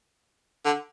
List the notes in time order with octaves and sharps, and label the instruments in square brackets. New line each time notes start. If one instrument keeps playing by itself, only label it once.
[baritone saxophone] D3